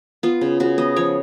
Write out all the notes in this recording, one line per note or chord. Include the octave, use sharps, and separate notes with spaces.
B3 F4
C#3
C#3 F#4
B3 D#5
F3 C#5